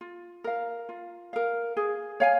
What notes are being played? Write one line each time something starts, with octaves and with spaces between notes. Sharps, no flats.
F4
A#4 F5
F4
A#4 F5
G#4
C#5 F5 G#5